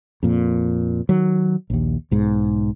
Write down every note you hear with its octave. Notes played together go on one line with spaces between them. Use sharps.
F2 A#2
D#3 F#3
A#1 D#2
B1 G#2